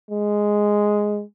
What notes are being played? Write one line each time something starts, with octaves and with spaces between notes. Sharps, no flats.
G#3